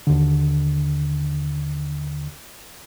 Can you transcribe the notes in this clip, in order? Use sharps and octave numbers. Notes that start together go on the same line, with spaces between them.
D#2 D3